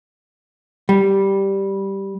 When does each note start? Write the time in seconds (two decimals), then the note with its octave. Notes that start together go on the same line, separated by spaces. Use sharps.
0.89 G3